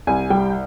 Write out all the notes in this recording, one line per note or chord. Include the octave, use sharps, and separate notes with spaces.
C2 G#5
G3 G5